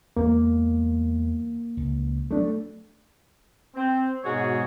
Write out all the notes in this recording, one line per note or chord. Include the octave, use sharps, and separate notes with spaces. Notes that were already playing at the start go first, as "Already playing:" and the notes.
E2 G#3 A#3
C#2
F#3 G3 A3 B3 D4
C4
G#2 B2 G#3 F#4 G#4 C#5